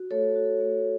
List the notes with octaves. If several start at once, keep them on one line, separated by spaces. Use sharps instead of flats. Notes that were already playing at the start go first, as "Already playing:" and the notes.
Already playing: F#4
A3 A4 C#5
F#4
A3